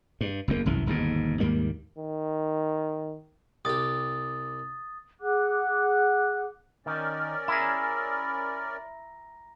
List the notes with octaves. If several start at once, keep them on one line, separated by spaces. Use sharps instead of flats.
G2
F#1 E2 A#3
G1 C2 F#2 E3
G1 D#2 G#2 B2
D#2 G#2 G3 A#3
D#3
C2 G4 D#6 A6
G#4 F#5 D6 F#6
D#3 C#4 A#4 D5
E4 G#4 A#5 A#6